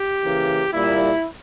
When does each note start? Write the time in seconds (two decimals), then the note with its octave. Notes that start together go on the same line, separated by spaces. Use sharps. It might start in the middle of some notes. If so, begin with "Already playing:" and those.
Already playing: G4
0.24 C#3 E3 A#3
0.73 A#2 G3 A#3 E4